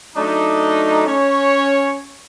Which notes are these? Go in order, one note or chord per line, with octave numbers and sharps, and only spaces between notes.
F#3 A3 D4 D#4
C#4 C#5